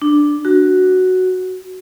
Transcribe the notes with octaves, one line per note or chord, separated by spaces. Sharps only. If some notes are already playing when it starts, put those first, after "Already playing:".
D4
F#4